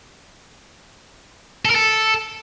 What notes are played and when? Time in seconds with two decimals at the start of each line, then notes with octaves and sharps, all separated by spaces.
1.65 A4
1.70 A#4
1.75 A4